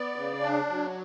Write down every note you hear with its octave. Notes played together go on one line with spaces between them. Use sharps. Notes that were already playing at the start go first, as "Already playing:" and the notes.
Already playing: B3 D5
C#3
D4
F#3